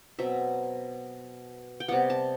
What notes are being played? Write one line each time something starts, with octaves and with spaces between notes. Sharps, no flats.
B2 F#3 C4 E5
G5
C3 G3 B3 F#5
A5